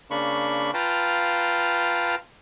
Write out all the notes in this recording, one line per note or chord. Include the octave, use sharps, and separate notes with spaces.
C#3 A#3 D4 B5 C#6
F4 B4 F5 G5 A5 A#5